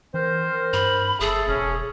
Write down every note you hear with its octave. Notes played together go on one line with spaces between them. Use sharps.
E3 C4 A#4 C5
G2 B5
F#1 A3 G#4 A4
E1 C#4